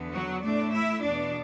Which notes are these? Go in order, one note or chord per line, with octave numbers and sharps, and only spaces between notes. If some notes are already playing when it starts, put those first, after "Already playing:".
Already playing: E2 D3 B3
F#3 F#4
A2 A3 D4 D5
E4 E5
E2 B2 B3 D4 D5